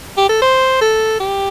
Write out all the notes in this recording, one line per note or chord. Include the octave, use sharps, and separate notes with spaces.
G4
A4
C5
A4
G4